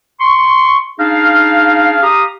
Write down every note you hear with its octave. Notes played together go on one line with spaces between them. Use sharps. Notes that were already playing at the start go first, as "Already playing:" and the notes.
C6 C#6
D4 D#4 G#4 F5
G4 F5 A#5 D#6